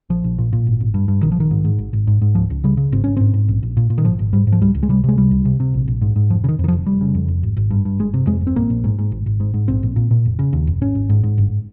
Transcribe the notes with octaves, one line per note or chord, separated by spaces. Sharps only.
A#1 F3
A#1
A#2
A#2
G#1
G#1
G2
G2
A#1 D#3
F3
A#1 D#3
G#2
G#2
G#1
G#1
G#2
G#2
C#2 F3
C#2
C#3 G3
C#3
G#1 C4
G#1 C#4
G#2 C4
G#2
A#1
A#1
A#2
A#2
D#3
G#1 F3
G#1
G#2 G3
G#2
F3
C#2 G3
C#2
G#3
C3 G3
C3 G#3
C#2 G3
C#2
C3
C3
A#1
A#1
G#2
G#2
F1 F3
C#3
D#3
F2
D#3
F3
F1
F1 G3
C#3
F2
F1
G#1
G#1
G2
G2
G1 G#3
C3
F2 G#3
G1
C4
A#1 A#3
A#1
G#2
G#2
G#1
G#1
G#2
G#2
A#1 C4
A#1
A#2
A#2
F1
C#3
D#2
F1
G#1 C#4
G#1
G#2
G#2
G1